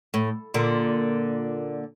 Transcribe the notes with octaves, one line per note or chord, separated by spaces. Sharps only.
A2
A#2 D3